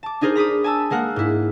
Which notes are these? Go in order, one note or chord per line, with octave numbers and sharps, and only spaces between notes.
A5 D6
D4 D#4 G#4 A#4 C5
A#5 B5 D6 D#6
G#5 A5 E6
G#3 A#3 A#4 F#5
G#2 E4